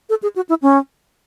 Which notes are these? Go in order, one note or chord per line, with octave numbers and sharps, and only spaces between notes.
A4
G#4
F#4
E4
C#4